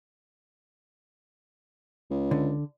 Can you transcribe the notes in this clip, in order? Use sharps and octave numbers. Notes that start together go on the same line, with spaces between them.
C#2
D3